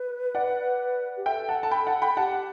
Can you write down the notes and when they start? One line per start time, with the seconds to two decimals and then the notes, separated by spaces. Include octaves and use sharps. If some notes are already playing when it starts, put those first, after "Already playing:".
Already playing: B4
0.35 D5 F#5
1.17 G4
1.26 A4 E5 G5
1.49 F#5 A5
1.63 A5
1.71 G5 B5
1.87 F#5 A5
2.02 G5 B5
2.17 G4 F#5 A5